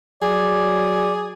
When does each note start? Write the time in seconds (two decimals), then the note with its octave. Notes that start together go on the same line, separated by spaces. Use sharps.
0.22 F#3 G#4 D5